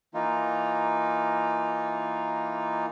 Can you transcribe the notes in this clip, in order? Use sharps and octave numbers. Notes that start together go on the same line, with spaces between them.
E3 A#3 D#4 F4